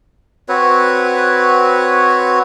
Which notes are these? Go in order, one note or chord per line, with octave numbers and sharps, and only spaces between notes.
C4 F#4 B4 C#5